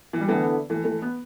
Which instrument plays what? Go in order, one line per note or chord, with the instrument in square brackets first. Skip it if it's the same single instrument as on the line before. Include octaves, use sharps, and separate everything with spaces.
[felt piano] E3
G3
[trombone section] D3 B3 E4 A4 [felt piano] E3 A3
[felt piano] E3 A3
E3 A3
B3